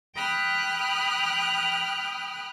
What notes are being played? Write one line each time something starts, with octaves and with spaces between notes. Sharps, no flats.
G5 B5 D#6 F6 F#6